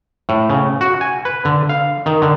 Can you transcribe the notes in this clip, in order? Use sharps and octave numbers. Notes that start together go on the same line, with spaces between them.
A2
C#3
F#4
G#5
B4
D3
F5
D#3
D3